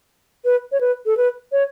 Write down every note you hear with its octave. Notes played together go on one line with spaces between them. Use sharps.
B4
C#5
B4
A4
B4
C#5